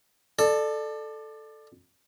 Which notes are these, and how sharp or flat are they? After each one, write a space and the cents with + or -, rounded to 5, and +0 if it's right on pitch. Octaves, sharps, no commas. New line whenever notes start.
A4 -5 D5 +25